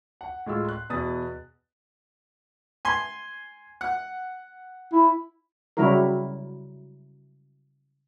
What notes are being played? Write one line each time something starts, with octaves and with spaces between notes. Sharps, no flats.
F#5
A2 G#3 F4 E6
C6 F#6
E2 B2 D#6 A6
G#5 C6
F#5
E4
C#3 F#3 G3 E4 F#4 A#4